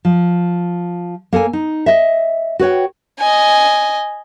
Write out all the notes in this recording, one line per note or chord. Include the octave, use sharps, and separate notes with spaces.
F3
A#3 A4 C#5 G#5
D#4
D#5 E5
F#4 B4 C#5 G5
D#5 G#5